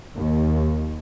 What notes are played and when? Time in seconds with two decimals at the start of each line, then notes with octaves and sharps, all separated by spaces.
0.15 D#2